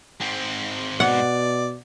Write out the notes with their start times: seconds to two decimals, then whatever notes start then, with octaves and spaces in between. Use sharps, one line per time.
0.21 G#2 C4
1.00 B2 D5 F#5